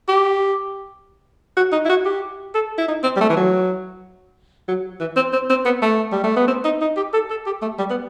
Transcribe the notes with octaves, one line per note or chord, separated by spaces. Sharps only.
G4
F#4
D#4
E4
F#4
G4
A4
E4
D#4
C4
G3
A3
E3
F#3
F#3
E3
C4
C4
C4
B3
A3
G3
A3
B3
C4
D#4
D#4
G4
A4
A4
G4
A3
G3
B3